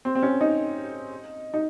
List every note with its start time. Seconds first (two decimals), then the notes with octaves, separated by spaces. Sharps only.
0.05 C4
0.15 C4
0.23 C#4
0.41 D#4
1.54 D#4